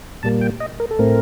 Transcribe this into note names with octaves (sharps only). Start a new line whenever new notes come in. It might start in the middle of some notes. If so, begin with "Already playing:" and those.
A#2 G3 A#3 A5
G5
D#5
A#4
A4
A2 A3 C4 A#4